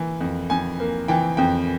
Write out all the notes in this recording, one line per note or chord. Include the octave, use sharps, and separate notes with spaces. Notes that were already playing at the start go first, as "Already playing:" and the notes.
Already playing: E3 A#3
F2
F2 G#5
A#3
E3 G5
F2 G5